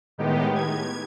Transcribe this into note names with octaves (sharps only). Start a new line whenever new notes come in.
A2 D#3 G#3 B3 D#4 G4
G#6